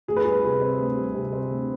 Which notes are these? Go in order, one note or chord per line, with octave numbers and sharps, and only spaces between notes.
D2 G#4
B4
G3 G#4
C3
C4
D2
G3
C3
C4
D2